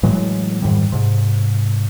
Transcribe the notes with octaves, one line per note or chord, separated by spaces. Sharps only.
A2 E3 F#3 G#3
F2 G#2 D#3 G3
G#2 C3